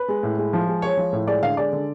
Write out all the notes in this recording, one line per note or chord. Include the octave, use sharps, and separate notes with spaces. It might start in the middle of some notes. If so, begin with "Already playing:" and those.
Already playing: B4
G#3
A2
G#3
F3
G#3
G#3 C#5
F3
A2
G#3 D5
D3 F5
G#3 D5
D3